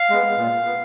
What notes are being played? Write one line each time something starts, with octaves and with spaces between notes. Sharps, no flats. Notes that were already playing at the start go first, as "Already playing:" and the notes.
Already playing: F5
G#3 B3
A#2
B3